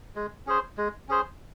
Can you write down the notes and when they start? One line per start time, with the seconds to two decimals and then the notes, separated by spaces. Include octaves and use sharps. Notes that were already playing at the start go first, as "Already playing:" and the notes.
0.15 G#3
0.46 C#4 G#4 C5
0.77 G#3
1.09 C#4 G#4 C5